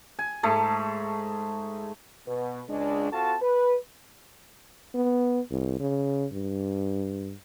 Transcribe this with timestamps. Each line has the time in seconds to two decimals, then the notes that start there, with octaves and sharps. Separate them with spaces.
0.19 G#5
0.43 G#2 A3 A5
2.27 B2 B4
2.69 C#2 G#3 D4
3.12 C4 F4 F#4 A4 A5
3.42 B4
4.95 B3
5.51 C2
5.80 C#3
6.32 G2